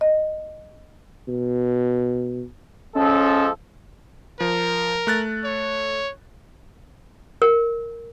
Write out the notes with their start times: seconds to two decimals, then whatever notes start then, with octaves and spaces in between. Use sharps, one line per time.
0.01 D#5
1.28 B2
2.96 F3 G#3 C#4 A4
4.40 F3 A#4
5.07 A3 F#6 A6
5.45 C#5
7.42 A#4